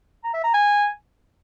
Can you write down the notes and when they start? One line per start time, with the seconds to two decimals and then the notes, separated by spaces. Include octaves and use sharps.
0.24 A#5
0.34 E5
0.44 A#5
0.54 G#5